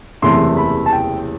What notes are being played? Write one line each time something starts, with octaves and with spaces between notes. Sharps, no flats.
F#1 E2 C3 E3 A3 C6
B5
A5
G5